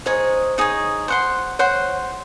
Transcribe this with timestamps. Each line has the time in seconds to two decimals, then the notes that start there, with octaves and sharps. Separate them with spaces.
0.06 D#4 G#4 C5 C#5
0.58 D#4 G#4 C#5
1.08 C5 F#5 C6
1.59 C5 C#5 F#5 C6